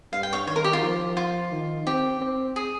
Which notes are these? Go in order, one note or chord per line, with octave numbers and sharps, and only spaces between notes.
G2 F5
G5
C#5 F5
D#3 C#5
A#4
G4
F4
F3
F4
D#3
C4 G4
C4
G#4